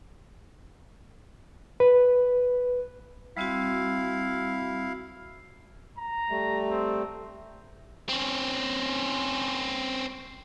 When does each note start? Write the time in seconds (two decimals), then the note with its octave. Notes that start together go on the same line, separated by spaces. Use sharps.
1.80 B4
3.37 G3 C4 E4 F#4 F5
5.98 A#5
6.30 G3 A3
6.69 C4
8.09 C4 C#4